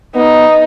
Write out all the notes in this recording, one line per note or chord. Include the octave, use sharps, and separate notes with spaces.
B3 D#4